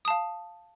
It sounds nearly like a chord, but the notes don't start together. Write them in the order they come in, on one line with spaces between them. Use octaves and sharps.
D#6 A5 F5